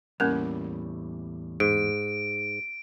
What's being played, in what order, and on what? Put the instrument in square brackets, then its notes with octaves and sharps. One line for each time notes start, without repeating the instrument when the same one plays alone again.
[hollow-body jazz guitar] E2 A2 G3 [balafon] A#3 C#4 A#4
[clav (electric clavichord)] G#2 [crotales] D7